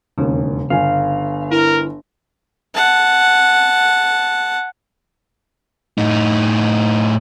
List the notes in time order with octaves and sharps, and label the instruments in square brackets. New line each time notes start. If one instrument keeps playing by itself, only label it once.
[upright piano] E1 D#2 [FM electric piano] C#3
[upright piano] G1 G#5 [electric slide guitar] F5
[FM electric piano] E4 [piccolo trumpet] A#4
[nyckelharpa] F#5 A5
[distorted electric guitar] A2 D#4